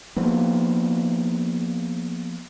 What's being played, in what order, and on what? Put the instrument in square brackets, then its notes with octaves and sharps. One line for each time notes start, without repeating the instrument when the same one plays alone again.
[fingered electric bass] F3 A#3 B3